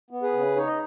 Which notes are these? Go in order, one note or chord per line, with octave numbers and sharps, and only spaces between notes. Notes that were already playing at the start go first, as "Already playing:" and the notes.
B3
G#4 B4
C#3
D#4 C#5
D#5